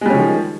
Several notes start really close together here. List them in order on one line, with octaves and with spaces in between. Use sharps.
G#3 G3 C#4 F3 D#3